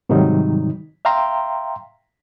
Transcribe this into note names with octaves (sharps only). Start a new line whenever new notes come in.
G#2 C3 D#3 F#3 G3 D#4
E5 F5 G5 A#5 C6